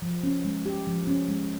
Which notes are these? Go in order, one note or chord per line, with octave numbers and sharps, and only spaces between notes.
F3
C#4
G#3
G4
F3
C#4
G#3